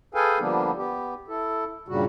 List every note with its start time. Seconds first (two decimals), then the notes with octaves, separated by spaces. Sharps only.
0.14 G#4 A4 B4 F5 G5 G#5
0.40 D3 F3 G3 A#3 B3 D4
0.77 B3 G4
1.28 E4 A4
1.88 G2 A#2 C#3 G3 F#4